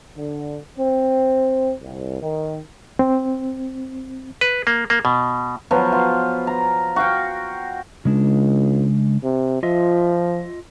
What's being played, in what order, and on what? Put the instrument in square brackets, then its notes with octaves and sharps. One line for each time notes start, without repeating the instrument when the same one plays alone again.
[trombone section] D3
C4
C2
D#3
[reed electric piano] C4
[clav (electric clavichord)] B4
A#3
A#3
B2
[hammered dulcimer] F3 F#3 B3
F4
A#5
F#4 F5 G5
[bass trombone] C#2 [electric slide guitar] C#3 G#3 D4
[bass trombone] C3
[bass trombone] F3 [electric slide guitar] F4 D#5 E5